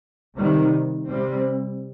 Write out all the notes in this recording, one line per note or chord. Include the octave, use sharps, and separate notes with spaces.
C3 D#3 G3
C3 G3 C4